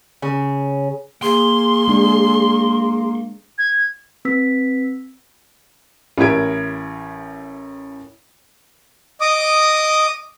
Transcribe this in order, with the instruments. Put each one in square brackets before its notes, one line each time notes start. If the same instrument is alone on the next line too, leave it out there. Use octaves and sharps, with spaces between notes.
[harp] C#3
[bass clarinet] A#3 [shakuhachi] G#4 [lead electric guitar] C6
[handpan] G#3 D4
[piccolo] G#6
[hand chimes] C4 B4 E6 B6
[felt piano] A1 E4 G4 A#4 G#6 D7
[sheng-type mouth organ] D#5 D6 D#6